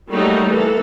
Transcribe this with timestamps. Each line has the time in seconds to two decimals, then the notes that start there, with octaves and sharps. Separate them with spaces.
0.10 F#3 G3 A3 A#3 D#4 F#4
0.48 E3 A#3 A4